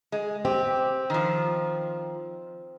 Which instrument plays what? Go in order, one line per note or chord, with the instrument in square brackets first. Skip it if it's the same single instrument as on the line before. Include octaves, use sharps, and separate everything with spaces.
[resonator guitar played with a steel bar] G#3
[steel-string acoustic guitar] C4 [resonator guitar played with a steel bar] G4
[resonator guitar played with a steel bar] D#3 F3